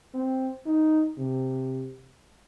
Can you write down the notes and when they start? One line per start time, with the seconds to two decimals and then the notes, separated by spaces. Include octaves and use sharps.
0.14 C4
0.66 D#4
1.18 C3